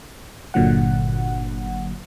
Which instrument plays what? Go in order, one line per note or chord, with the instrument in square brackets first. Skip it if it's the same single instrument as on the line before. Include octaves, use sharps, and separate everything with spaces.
[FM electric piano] G1 A#2 D3 F#3 F#5